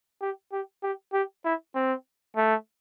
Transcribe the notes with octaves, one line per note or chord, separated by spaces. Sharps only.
G4
G4
G4
G4
E4
C4
A3